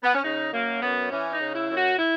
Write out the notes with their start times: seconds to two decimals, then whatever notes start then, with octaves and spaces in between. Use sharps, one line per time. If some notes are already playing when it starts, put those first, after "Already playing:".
0.04 B3
0.15 C#4
0.24 C#3 D#4
0.53 F#2 A#3
0.82 F#2 B3
1.11 E3 C#4
1.33 D#4
1.41 C#3
1.55 E4
1.70 F#2
1.77 F#4
1.99 E4